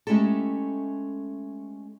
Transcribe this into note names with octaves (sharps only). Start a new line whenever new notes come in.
G#3 A3 C#4 E4 G4 A4